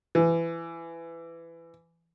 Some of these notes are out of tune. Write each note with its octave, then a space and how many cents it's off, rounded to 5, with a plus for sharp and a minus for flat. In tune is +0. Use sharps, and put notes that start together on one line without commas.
E3 +20